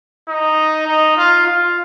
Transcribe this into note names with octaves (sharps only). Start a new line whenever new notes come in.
D#4
D#4
F4
F4